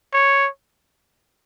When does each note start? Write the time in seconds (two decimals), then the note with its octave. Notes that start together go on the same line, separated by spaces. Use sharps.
0.13 C#5